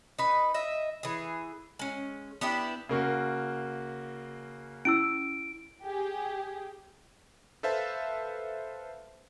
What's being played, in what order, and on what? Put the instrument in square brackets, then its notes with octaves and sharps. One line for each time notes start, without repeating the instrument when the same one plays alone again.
[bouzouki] D#4 B4
D#5 E5
E3 G#4
G#3 C#4
B3 D4 E4 G4
[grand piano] C#3 A#3 F#4
[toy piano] C#4 E4 E6 [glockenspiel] D7
[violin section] G4 G#4
[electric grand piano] A4 B4 C5 E5 F5 A5